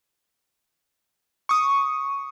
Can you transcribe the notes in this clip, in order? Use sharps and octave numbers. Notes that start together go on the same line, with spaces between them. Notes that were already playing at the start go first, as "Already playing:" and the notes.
C#6 D#6